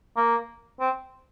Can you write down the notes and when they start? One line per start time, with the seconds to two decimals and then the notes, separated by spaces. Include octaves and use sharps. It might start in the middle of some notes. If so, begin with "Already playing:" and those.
0.17 A#3
0.80 C4